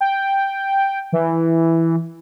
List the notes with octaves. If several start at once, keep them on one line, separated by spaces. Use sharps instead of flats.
G5
E3